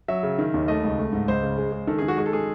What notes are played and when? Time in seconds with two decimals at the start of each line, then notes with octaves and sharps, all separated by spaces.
0.08 F#3 E5
0.23 C#3
0.39 D#3
0.54 D#2
0.68 A3 D#5
0.84 C#2
0.98 A3
1.12 G#2
1.28 C#2 C5
1.43 C#3
1.58 G#3
1.72 G#3
1.87 D#3 A4
1.98 G#4
2.02 D#3
2.08 F#4
2.17 G#3 G#4
2.26 A4
2.33 G#3 G#4